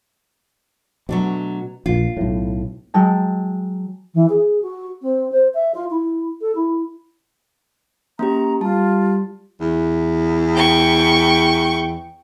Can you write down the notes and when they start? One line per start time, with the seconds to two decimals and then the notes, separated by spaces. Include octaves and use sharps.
1.09 B2 F#3 A3 D4
1.86 A#1 A#2 F4
2.17 B1 A2
2.94 F#3 G#3 G5 A5
4.14 E3
4.29 G#4
4.62 F#4
5.01 C4
5.31 C5
5.54 E5
5.74 F4
5.90 E4
6.41 A4
6.55 E4
8.19 A#3 C#4 G4 A#5
8.61 G3 F4 A5
9.61 E2
10.55 G5 C#6